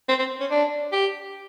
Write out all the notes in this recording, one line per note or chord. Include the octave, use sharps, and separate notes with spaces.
C4
C4
C#4
D4
G4